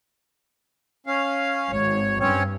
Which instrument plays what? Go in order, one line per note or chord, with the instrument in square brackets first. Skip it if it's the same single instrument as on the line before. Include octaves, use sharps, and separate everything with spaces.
[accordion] C#4 F5
[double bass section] G#1 [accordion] C#5
[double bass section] G2 [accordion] C4 C#4 C#5